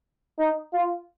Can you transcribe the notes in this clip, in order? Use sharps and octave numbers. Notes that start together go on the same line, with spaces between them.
D#4
F4